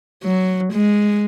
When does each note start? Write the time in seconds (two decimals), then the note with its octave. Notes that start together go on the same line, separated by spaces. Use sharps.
0.24 F#3
0.73 G#3